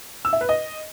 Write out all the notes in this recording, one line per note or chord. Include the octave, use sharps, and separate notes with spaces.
E6
E5
B4
D#5